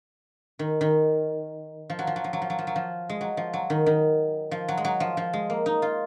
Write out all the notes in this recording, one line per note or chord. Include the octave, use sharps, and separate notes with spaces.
D#3
D#3
F3
F#3
F3
F#3
F3
F#3
F3
F#3
F3
F#3
F3
G#3
F#3
F3
F#3
D#3
D#3
F3
F#3
G#3
F#3
F3
F3
G#3
A#3
D#4
F4